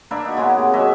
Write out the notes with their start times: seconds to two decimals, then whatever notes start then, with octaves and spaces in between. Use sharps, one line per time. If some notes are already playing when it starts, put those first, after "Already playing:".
0.11 A#3 D4 B4 E5
0.25 D#4 F#4
0.37 C#3 G#3 A#3 B3
0.58 C3
0.73 F#3 G#3 D#5 E5